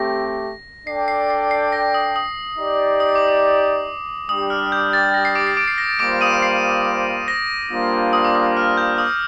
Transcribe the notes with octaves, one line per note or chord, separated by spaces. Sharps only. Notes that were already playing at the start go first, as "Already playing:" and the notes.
Already playing: A3 C4 G4 A#6
D4 A4 D5 G5 C7
C7
C7
C7
A#6
D#6
D#6
D#4 G4 D5
D#6
D6
D6
G3 D4 G4 D#6
F6
G6
A6
A#6
C7
D6 D7
C7
D6 D7
C7
A#6
A6
G3 A#3 F4 C5 D6 D7
D#6 D#7
C7
A#6
G3 A#3 D4 F4 C5
D#6
D6
D#6
F6
G6
D#6